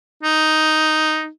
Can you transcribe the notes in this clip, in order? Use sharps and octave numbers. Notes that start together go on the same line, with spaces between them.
D#4